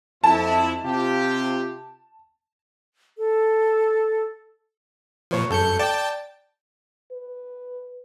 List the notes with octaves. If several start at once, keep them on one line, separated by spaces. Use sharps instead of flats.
F2 E4 A5
C3 F4 G4
A4
A#2 F3 B4 C#5
F#2 A4 G6 C#7
D5 G5 A5
B4